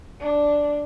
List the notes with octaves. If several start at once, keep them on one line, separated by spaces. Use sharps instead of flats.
D4